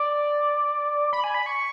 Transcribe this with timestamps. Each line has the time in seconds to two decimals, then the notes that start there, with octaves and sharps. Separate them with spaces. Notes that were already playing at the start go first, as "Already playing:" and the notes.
Already playing: D5
1.13 B5
1.24 G#5
1.34 B5
1.46 C#6